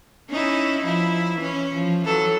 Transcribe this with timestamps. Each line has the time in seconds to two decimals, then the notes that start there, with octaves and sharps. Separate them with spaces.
0.30 C#4 D#4 E4
0.84 F3 E4
1.38 E3 C#4
1.74 F3
2.05 E3 F#3 A4